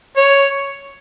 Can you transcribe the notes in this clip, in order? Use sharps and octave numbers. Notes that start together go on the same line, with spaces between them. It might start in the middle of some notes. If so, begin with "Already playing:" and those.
C#5